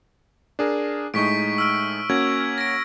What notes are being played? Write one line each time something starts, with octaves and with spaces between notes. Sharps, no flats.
D4 G#4 A#4
A2 G#3 D#4 C#6 B6 D7
E6 F6 D7
A#3 C#4 F#4 G#6
A#6 D7